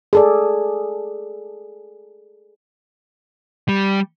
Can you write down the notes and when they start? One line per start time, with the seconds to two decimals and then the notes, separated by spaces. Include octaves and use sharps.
0.13 G#4 A4 D5
3.69 G3